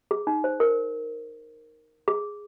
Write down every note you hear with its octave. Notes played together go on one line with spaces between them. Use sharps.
G#4
D#4
C5
A#4
G#4